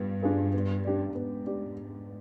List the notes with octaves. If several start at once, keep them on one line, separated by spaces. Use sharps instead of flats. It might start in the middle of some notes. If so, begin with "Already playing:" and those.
Already playing: G2 B3 D4 F4
D4 F4 G#4 B4
B3
D4 G4 D5
G#2 B3
D4 G4 D5